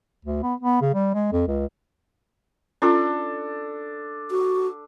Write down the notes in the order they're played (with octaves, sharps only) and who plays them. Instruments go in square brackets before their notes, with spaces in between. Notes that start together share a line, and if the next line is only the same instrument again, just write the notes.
[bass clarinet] D2
B3
B3
C#3
G3
G#3
F2
C#2
[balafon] C#4 F4 [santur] D4 A4
[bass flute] F#4